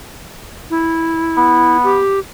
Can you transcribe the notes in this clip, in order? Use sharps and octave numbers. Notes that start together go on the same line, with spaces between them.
E4
B3
G4